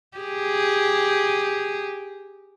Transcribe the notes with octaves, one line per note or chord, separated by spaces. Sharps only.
G4 G#4